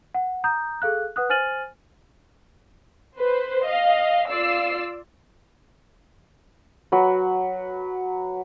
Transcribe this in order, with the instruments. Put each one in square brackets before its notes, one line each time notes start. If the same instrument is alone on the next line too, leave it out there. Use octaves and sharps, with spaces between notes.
[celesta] F#5
A#5 D#6 G6
G#4 A4 F5 F#6
B4 F#5 D#6 F#6
C5 G#5 F6 A6 D#7 F#7
[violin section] B4 C5
D#5 F5
F4 D5 E6 C7
[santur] F#3 B4